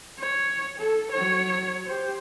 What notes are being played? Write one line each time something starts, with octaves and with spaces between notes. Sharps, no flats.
C#5
A4
F#3 C#5
G4 C5